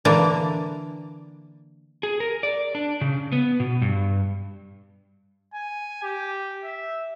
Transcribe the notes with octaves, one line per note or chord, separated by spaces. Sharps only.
D3 E3 A#3 D4
G#4
A#4
D5
D4
C#3
B3
B2
G2
G#5
G4
E5